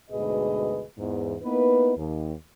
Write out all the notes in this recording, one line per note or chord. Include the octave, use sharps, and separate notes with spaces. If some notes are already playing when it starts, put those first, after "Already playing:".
D2 G#2 B2 G#4 B4 D#5
E2 G#2
A#3 B3 D#4 E4 B4
D#2